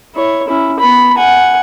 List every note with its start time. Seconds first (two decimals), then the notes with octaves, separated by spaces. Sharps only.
0.15 E4 C#5
0.48 C#4 E4
0.80 B3 B5
1.17 F#5 G#5